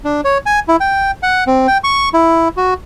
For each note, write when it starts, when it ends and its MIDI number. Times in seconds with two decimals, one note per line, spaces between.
0.05 0.21 62
0.24 0.38 73
0.46 0.60 80
0.68 0.76 64
0.80 1.11 79
1.23 1.44 78
1.47 1.67 60
1.67 1.78 79
1.84 2.09 85
2.14 2.48 64
2.57 2.74 66